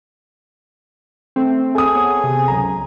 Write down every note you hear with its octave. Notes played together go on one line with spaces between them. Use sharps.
A3 C4
G#4 A4 D#6
B3 C#5
C3
C#2 F#2 A#5